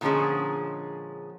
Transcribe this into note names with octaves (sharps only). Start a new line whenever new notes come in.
A#2 D3 F3 G#3 C#4 G#4